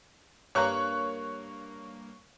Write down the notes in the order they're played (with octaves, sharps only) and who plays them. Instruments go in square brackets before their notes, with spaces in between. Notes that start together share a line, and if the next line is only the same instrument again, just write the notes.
[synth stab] G2 A#3 [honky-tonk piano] C#5 C#6 F#6